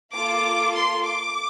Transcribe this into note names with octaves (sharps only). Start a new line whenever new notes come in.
A#3 F4 A4 D6
C6
D6